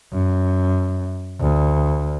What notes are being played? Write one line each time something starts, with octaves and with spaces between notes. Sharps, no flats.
F#2
D2